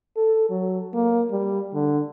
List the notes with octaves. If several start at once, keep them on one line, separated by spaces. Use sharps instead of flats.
A4
F#3
A#3
G3
D3